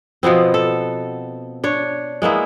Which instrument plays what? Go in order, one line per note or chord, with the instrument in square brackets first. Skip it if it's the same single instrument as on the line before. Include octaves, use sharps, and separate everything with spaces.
[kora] B2 F3 B3 C4
A4
D4 C#5
G#3 A#3 B3 E4